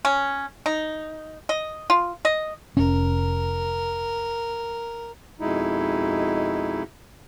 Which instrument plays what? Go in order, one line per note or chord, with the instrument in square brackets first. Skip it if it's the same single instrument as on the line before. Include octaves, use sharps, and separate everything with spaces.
[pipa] C#4
D#4
D#5
F4
D#5
[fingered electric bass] F1 C#4 [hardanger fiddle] A#4
[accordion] F2 B2 G#3 D#4 E4